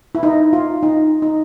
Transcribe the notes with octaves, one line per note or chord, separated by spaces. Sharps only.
E4
D#4
F4
D#4
D#4